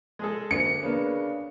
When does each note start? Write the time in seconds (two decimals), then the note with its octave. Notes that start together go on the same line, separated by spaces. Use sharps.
0.19 G#3 G#4 A4
0.51 D2 D3 A#3 C#7
0.83 C#3 A#3 B3 D4